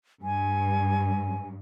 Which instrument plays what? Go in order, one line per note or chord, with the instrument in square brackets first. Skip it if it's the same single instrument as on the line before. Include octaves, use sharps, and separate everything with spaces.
[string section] G2 [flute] G#5